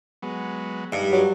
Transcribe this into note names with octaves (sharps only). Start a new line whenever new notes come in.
F#3 G#3 B3
G2 D#4
F#3